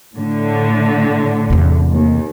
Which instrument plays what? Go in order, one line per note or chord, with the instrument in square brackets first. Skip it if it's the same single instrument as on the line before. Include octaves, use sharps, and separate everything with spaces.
[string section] A2 D3
[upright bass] E2 C3
[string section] D#2